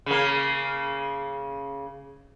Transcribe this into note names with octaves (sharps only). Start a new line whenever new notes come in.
C#3 A#3